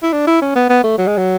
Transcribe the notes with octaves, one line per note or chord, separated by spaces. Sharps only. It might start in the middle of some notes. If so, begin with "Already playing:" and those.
E4
D4
E4
C#4
B3
B3
A3
F#3
G#3
F#3